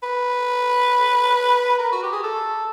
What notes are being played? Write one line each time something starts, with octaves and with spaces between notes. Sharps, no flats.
B4
A#4
F#4
G4
G#4
A4